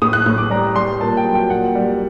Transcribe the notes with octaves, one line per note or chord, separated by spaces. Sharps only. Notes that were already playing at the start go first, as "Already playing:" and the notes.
A2 D#6
F#6
A2 F#6
D6
G3 A#5
G3 C6
A#2 A5
G5
F#3
G5
A#2 F#5
G3